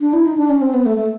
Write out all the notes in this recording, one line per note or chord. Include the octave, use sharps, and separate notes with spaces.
D4
E4
D#4
D4
C#4
C4
B3
A3
A3